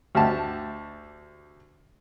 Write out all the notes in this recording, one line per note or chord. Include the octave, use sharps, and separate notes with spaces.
D2 G4 A5